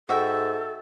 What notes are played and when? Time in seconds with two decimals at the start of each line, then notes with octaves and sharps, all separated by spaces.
0.09 G#2 F#4 A4 E5 G5